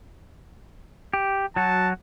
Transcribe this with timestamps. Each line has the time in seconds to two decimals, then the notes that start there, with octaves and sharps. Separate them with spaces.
1.13 G4
1.56 F#3 F#4 A5